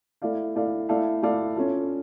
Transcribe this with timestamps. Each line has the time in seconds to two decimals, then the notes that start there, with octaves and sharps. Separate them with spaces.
0.22 A3 E4 A4 D5 F5
0.55 A3 E4 A4 D5 F5
0.89 A3 E4 A4 D5 F5
1.23 A3 E4 A4 D5 F5
1.56 C#4 F4 A4